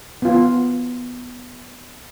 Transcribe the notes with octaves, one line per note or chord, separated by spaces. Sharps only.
B3 F4